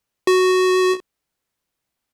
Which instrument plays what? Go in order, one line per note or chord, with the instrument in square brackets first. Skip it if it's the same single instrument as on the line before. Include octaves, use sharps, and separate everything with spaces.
[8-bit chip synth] F#4